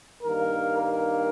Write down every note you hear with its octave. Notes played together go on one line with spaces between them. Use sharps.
G2 D#3 A#3 A#4
A#4